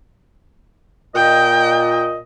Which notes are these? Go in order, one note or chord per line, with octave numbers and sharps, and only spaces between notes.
A#2 D#5 G5